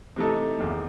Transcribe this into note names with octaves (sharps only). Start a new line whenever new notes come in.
C3 E3 A3 D#4 A4
E1 E2 D#3